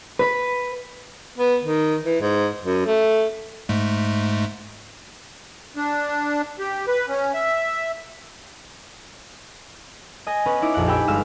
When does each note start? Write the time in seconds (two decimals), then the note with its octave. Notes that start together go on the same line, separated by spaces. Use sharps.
0.19 B4
1.38 B3
1.63 D#3
2.05 E3
2.21 G#2
2.64 F#2
2.86 A3
3.69 G#2 G#3 A3
5.77 D4
6.59 G4
6.88 B4
7.08 C#4
7.34 E5
10.27 D#5 G#5 A#6
10.46 B3 C#4 B4
10.62 D#4 E4 D6
10.74 A#1 F2 F5 F#5
10.87 G4 G5 G#5 B5 E6
11.08 G1 G#3 F5 E6 F6 E7